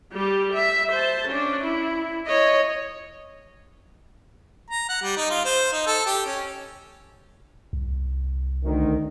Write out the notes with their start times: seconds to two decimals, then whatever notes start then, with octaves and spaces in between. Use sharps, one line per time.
0.13 G3 G4
0.53 E5
0.92 C5 A5
1.29 C#4 D4
1.65 E4
2.27 C#5 D#5
4.70 A#5
4.89 F#5
5.02 G3
5.17 D#4
5.31 F4
5.45 C5
5.72 D#4
5.86 A4
6.06 G4
6.26 C#4
7.73 C2
8.64 D2 D#3